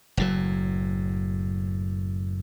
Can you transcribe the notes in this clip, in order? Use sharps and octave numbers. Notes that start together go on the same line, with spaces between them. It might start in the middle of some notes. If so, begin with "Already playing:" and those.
F#1 A2 F#3